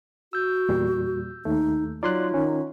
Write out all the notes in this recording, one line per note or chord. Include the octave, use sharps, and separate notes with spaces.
F#4 E6 G6
E2 A#2 G3
D#2 A3 D#4
F#3 D#4 F4 C#5 D5 C6 F#6
D#3 C#4